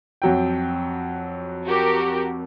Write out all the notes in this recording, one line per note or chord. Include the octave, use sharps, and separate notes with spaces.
F2 F#3 G5
F#4 G4 A#4